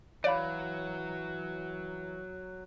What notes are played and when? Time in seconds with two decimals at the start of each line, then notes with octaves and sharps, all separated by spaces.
0.24 E3 F#3 C#5 D5 F5 B5